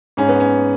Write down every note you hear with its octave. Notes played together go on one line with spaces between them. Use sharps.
G#2 C#4
B3
C#4